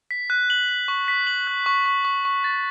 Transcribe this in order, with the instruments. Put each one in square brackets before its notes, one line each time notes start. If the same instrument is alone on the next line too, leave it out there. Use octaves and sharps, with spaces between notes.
[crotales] B6
F#6
F#7
F#7
C#6
B6
F#7
F#6
C#6
C#6
C#6
C#6
A6